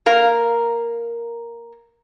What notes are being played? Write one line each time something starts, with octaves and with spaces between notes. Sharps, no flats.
A#3 A#4 F5